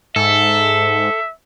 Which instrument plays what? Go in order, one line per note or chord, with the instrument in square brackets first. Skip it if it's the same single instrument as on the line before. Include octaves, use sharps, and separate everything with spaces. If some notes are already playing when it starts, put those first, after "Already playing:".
[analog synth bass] G#2 [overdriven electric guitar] A4 [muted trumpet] E5